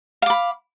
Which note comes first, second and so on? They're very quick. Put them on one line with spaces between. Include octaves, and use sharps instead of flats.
F5 D6 B5